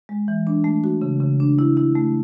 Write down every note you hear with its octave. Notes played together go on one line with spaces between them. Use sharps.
G#3
E3
D4
A3
F#4
C#3
C#3
D4
E4
E4
A3